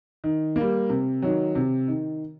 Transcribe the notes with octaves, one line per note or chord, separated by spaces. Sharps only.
D#3
G3 A#3
C3
D#3 F#3
C3
D#3